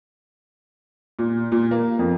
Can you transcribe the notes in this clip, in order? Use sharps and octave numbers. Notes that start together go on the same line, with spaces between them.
A#2
A#2
A#3
F2